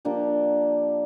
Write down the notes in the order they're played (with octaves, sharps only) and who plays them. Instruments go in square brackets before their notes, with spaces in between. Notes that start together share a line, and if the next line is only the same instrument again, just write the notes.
[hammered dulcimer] F3 A#3 D4 G4